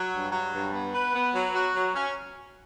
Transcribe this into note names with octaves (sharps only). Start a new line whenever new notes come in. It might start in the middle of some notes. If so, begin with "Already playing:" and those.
Already playing: F#3
G2
F#3
G2
B3
B4
B3
F#3
F#4
F#3
C#4